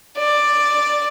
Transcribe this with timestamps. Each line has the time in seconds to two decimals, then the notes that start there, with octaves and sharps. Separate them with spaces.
0.18 D5